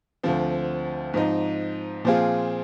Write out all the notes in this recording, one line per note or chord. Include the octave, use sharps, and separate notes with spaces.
D2 D3 F3 C4
G#2 F3 C4 D#4
A#2 F3 C4 F4 G#4